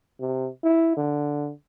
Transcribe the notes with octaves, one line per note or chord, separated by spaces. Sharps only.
C3
E4
D3